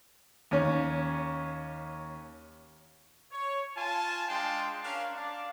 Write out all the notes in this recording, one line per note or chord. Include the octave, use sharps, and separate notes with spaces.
D#2 C#4
C#5
F4 G#5 A5
G#3 D4 F5 G5 A5 C6
C#4 D4 A#4 F5
D4 D5 F5